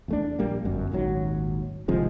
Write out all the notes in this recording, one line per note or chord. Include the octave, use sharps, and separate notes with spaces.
E2 A3 D4
A#1 G3 A#3
G1 F#2
D#1 G#1 D#2 F#3
G#1 C3 F3 G#3